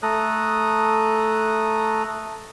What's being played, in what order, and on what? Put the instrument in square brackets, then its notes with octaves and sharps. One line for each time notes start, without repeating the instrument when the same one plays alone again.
[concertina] A3 A4 A#5 D#6 F#6